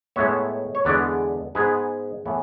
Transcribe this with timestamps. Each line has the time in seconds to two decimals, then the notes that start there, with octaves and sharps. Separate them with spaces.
0.16 A2 G#3 B3 C#5 E5
0.75 C#5
0.85 E2 D3 G#3 B3 B4 D5
1.55 G#2 G#3 B3 G#4 B4
2.26 A2 E3 B3